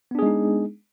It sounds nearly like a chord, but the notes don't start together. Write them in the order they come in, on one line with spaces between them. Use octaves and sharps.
B3 D4 G#4 G#3 D#4